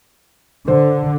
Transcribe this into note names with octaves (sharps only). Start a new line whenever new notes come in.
D3 C5